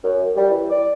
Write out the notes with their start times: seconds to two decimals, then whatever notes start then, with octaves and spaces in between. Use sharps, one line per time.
0.04 F#2
0.36 G3
0.50 E3
0.70 D5